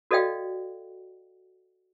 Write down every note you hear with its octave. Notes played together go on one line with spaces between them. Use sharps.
F#4 A4 D5 D#5 F5 G5